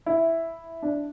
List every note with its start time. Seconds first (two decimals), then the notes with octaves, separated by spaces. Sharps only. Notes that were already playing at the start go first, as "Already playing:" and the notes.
0.06 E4
0.82 D4